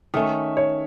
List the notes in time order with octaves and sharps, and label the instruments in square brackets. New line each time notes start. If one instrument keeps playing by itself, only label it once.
[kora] D#3 A3 C#4 [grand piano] E5
[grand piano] C#5